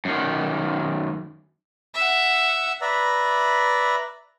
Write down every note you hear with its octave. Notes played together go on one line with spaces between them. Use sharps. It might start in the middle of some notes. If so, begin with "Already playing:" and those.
F#2 D#3
E5 F#5
B4 D5 E5 A#5 B5